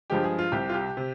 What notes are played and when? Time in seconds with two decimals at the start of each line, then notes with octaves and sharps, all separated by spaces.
0.10 G2 F3 G#3 G4
0.24 G#4
0.39 F4
0.52 C2 C3 G3 G4
0.69 F4
0.74 G4
0.97 C3